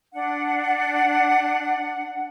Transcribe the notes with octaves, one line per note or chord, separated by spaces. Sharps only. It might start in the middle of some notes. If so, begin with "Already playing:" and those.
D4 F#5